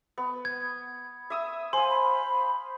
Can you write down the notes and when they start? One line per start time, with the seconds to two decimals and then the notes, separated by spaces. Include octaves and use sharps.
0.18 B3
0.45 G#6
1.30 E5 D#6 E6
1.73 C5 F5 G#5 C6
1.90 B5